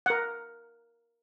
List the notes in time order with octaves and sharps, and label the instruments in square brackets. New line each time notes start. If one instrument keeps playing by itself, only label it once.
[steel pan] A#4 F#5